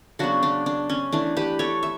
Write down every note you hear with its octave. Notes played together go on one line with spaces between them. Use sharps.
C#3 F#3 B3 D4 F#4
D4
D4
C#4
E3 A3 D4
G4 B4
A4 C#5
E5